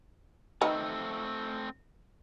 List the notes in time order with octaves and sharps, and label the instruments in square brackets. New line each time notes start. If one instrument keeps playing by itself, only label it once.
[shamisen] D#3 B4 [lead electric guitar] A3 C4